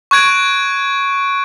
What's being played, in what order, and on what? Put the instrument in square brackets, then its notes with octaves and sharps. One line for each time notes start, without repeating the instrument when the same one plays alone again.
[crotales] C#6 F#6 G#6 D7